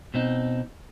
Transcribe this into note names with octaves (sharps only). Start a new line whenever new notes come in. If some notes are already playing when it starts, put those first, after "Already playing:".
B2 C4 D#4